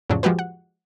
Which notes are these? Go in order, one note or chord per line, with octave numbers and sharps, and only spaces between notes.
F2 A2 C#3 F#3 D4
F3 G#3 F#4 G4 B4
F#5